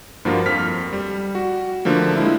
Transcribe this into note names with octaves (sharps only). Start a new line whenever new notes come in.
G2 F3 A#3 F4 F#4 A#4
F2 F6 B6
G3
F#4
D3 F3 A3 A#3
G#3 E4